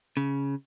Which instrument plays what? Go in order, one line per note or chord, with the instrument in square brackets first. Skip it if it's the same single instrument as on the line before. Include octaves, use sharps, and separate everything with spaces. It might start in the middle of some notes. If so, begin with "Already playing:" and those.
[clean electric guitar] C#3